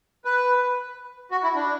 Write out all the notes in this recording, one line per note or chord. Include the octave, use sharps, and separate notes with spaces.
B4
F#4
E4
D4